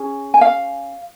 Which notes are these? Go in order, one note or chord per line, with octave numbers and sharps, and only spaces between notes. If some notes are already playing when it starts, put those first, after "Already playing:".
Already playing: C#4 G#4
G#5
F5